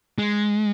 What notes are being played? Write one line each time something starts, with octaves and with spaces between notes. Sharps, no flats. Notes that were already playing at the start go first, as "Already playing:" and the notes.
G#3